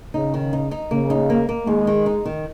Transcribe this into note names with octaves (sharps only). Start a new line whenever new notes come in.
C#3 D#4
D#3
D#4
D#4
C#3 A#3
D#4
A#3
A#3
D#2 G#3
D#3
D#4
D#3